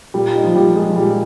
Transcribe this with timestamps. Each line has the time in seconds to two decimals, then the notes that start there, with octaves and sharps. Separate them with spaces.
0.14 A#2 G3
0.35 D#4
0.44 F3
0.55 F3 G3
0.75 G#3
0.90 F3
0.96 A#2 G3